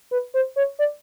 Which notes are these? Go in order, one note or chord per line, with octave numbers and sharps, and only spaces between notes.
B4
C5
C#5
D5